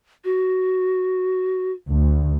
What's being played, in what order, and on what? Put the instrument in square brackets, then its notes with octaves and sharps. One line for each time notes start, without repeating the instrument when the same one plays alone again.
[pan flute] F#4
[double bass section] D2